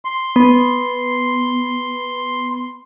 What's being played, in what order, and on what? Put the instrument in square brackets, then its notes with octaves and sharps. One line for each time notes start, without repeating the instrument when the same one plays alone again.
[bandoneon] C6
[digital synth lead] B3